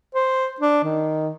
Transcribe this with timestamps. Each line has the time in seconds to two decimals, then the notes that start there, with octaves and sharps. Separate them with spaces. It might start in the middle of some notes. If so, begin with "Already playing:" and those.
0.15 C5
0.60 D4
0.84 D#3